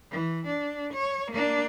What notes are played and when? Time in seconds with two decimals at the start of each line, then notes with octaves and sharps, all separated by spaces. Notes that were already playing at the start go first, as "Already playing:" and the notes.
0.11 E3
0.47 D4
0.93 C#5
1.31 A#3 D4